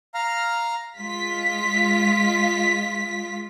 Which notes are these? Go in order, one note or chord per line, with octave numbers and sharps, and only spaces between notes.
F5 A#5 F6
G#3 F4 B6